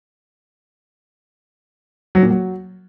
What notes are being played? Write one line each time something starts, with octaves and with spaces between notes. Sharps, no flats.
F#3
A#2
F#3